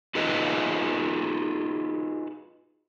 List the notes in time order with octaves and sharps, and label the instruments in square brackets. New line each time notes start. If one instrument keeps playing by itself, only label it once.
[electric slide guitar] D#4 F4 F#4 G#4 B4 D#5